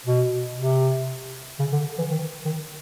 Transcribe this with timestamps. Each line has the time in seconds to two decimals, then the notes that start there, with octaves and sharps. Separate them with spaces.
0.06 B2
0.58 C3
1.60 C#3
1.73 D3
1.99 E3
2.11 D#3
2.45 D#3